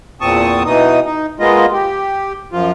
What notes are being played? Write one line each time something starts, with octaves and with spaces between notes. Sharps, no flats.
E2 A#2 C4 A5 C#6 D#6
B2 E3 D#4 D#6
D#4
G#3 A#3 B3 F4 D#5
G4
F#2 F3 F4